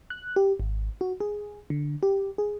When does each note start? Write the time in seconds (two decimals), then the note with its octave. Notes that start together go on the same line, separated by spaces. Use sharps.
0.10 F#6
0.36 G4
0.60 G#1
1.01 F#4
1.20 G#4
1.70 D3
2.03 G4
2.38 G#4